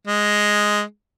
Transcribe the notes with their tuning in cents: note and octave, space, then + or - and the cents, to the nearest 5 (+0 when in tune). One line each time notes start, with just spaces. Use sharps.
G#3 +0